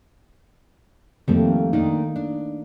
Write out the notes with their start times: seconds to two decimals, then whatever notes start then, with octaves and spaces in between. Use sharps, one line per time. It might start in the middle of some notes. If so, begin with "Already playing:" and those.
1.28 F2 D#3 G3 A3 A#3 C4
1.73 D#3 A#3 D4 D#4
2.16 D4